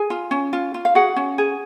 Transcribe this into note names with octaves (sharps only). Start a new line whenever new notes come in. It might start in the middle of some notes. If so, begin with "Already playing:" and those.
Already playing: G#4 G#5
F4
C#4
F4
F4
F5
F#4 G#4 F#5
C#4
G#4